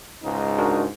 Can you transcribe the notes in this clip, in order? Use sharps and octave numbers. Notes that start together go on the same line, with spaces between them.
C#2 G#2 D#4
D4 F#4 A#4